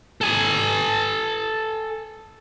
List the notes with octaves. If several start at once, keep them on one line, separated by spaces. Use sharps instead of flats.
A4 G#5